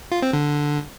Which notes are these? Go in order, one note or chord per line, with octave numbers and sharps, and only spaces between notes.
F4
C4
D3